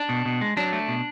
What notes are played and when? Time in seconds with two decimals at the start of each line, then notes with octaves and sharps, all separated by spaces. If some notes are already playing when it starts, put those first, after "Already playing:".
Already playing: D4
0.09 B2
0.26 B2
0.41 G#3
0.57 F#3 D4
0.73 A3
0.88 B2